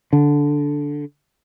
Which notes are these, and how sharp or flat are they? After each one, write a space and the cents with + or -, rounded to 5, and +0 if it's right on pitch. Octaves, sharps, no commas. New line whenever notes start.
D3 -10